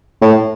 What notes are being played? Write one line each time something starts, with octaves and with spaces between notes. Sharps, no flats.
A2